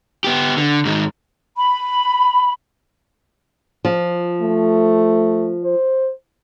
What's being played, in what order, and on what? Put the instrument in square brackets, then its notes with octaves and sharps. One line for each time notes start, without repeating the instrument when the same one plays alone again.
[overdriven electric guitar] B3 G4
D3
G#2 D#3
[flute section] B5
[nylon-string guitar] F3
[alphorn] A3
C5